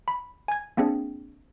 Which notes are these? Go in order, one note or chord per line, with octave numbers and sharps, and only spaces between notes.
B5
G#5 G#6
A#3 C4 D4 G#4